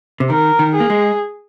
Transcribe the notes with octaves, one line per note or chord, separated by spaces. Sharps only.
C3
D#3 A#4
D#3
G#4
A#3
G#3